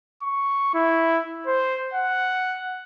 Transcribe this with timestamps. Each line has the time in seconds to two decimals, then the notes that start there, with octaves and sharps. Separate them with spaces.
0.23 C#6
0.74 E4
1.47 C5
1.94 F#5